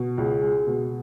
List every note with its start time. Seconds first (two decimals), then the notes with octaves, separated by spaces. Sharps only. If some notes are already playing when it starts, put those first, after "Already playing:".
Already playing: B2
0.18 C#2
0.42 G#3
0.67 B2